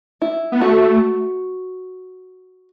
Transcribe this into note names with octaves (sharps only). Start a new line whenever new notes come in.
E4
B3
A3 F#4